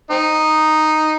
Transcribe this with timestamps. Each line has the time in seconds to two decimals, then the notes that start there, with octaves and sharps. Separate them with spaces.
0.11 C4 D#4